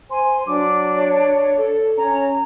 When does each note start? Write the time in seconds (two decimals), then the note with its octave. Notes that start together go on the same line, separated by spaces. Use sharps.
0.11 C5 G#5 C6
0.47 F#3 D4 D6
0.97 C#5
1.58 A4
1.98 C#4 C#5 A#5